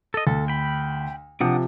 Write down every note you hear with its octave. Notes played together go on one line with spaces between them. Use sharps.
A4 D#5
D2 A4
G5 B5
C3 F3 D4 F#5 D#6